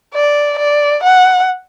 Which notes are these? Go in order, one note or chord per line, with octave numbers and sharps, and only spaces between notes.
D5
D5
F#5